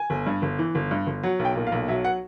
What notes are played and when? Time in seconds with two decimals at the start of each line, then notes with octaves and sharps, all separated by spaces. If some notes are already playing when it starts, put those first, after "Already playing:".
Already playing: G#5
0.10 G1
0.26 G2
0.42 G1
0.59 E3
0.75 G1
0.91 G2
1.07 G1
1.23 F#3 F#5
1.39 B1
1.45 G5
1.56 A#2
1.67 F5
1.72 B1
1.88 F#3 E5
2.05 F#5